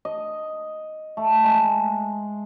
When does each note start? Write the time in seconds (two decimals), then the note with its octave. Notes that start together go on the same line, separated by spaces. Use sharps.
0.05 D#5
1.17 A3
1.44 G#3